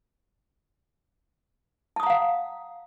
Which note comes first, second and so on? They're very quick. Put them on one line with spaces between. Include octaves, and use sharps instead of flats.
A5 D#6 A#5 F#5 F5